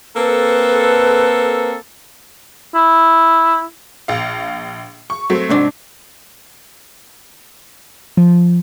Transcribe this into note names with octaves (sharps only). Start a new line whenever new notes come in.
A#3 C4 A4 B4
E4
A#1 F5
C#6
F#3 A3 C4
C2 G#2 D4
F3